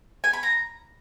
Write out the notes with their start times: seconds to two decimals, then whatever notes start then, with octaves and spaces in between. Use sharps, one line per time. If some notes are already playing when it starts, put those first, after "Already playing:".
0.24 G#5
0.33 B5
0.43 A#5